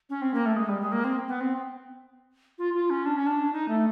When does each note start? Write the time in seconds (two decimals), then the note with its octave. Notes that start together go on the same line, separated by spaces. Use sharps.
0.10 C#4
0.22 C4
0.34 A#3
0.46 A3
0.56 G#3
0.69 G3
0.81 G#3
0.92 A#3
1.04 C4
1.28 B3
1.40 C4
2.58 F4
2.74 F4
2.90 C#4
3.06 D4
3.16 C#4
3.26 D4
3.53 D#4
3.69 A3